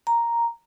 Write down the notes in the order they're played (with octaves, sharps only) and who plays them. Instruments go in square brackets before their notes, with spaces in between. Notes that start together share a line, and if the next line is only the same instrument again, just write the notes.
[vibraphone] A#5